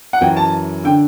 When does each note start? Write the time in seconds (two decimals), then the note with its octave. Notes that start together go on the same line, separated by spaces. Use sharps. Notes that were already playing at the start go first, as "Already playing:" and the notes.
0.13 F#5
0.21 F#2 E3 G5
0.37 A5
0.84 D3 G5